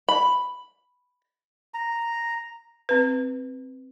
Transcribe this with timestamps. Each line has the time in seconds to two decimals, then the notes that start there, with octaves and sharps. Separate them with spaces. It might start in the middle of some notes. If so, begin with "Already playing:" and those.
0.09 B5
1.74 A#5
2.89 C4 B4